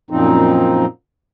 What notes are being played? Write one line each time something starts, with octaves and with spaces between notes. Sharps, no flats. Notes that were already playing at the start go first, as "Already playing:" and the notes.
F#2 A#2 F3 C4 D#4